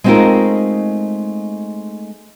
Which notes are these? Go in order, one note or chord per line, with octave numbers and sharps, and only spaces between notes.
G#3 A3 C4 D#4 F4 A#4